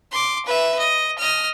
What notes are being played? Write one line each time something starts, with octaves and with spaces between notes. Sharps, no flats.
C6 D6
B4 E5
D#5
D#5 F6